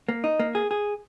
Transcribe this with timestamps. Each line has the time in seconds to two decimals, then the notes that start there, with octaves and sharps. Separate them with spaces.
0.09 A#3
0.24 D#4
0.40 A#3
0.55 G#4
0.71 G#4